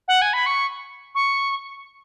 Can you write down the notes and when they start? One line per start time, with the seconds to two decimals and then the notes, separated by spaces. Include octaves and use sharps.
0.08 F#5
0.22 G#5
0.33 B5
0.46 C#6
1.15 C#6